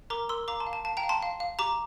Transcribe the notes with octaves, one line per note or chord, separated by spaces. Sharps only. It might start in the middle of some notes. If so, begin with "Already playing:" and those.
A#4 A#5 D6
A#4 C6 E6
F5 A#5 D6
A5 C6
F5
A5
F5 A5
G5 A#5
F5
A5 C6
F5
F5
G4 A#5 D6